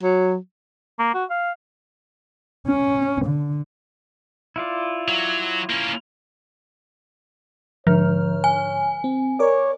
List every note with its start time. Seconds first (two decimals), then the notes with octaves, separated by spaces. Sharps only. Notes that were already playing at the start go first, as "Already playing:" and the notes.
0.03 F#3
0.99 A#3
1.15 F#4
1.30 F5
2.67 C#4
3.26 D3
4.56 E4 F4 D5
5.08 F#3
5.70 A#3 C#4
7.87 G#2 D3 F3 C#5 F6
8.44 G#5
9.04 C4
9.39 A#4 C#5 D5 D6